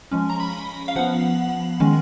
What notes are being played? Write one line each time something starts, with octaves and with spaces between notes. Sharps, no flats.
F3 G#3 C#4
A#5
B5
F5
F3 B3 F#5
D#3 G#3 C#4